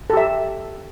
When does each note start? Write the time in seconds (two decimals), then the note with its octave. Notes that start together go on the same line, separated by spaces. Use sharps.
0.10 A4
0.13 G4
0.17 E5